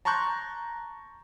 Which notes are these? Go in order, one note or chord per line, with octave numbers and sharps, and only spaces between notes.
A5 A#5 C6 C#6 F#6 G6